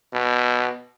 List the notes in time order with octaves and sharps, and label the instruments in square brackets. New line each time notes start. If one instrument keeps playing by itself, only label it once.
[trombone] B2